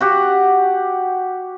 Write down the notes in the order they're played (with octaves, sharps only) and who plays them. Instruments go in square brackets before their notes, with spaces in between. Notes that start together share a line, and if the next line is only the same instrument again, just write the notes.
[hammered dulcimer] F#4 G4 F#5